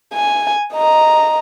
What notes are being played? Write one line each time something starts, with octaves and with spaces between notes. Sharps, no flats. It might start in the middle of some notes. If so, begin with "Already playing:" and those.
G#5
D#5 A#5